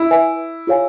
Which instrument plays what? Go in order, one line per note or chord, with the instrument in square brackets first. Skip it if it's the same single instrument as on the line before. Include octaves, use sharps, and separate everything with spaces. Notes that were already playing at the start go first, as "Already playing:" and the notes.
Already playing: [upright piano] E4
[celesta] B4 E5 G#5
F4 G#4 C#5 F5 G#5